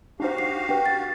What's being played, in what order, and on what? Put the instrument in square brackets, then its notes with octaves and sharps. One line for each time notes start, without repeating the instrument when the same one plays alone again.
[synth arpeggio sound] D4 D#4 C5 [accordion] F#4 G4 F5
[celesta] C7
[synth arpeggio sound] D4 B4 [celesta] G5
[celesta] A6